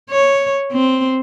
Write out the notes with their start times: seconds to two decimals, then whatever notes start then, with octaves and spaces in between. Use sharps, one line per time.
0.10 C#5
0.73 C4